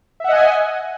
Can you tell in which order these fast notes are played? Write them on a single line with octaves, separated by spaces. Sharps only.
E5 F#5 D#5 G#5